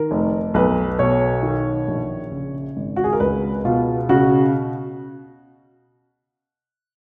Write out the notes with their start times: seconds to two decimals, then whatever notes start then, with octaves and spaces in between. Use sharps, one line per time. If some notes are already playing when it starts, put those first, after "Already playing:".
Already playing: D#3 A#4
0.11 F1
0.54 B1 B4
0.99 B2 C#5
1.43 D#3
1.88 A#1
2.31 C#3
2.76 G#1
2.96 F#4
3.04 G#4
3.13 A#4
3.20 C#2 B4
3.65 B2 F4
4.09 C#3 F#4